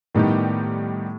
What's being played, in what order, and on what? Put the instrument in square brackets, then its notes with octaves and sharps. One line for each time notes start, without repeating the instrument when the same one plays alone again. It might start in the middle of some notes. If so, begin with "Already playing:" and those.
[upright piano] A2 [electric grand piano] D#3 G3 B3 D#4 G4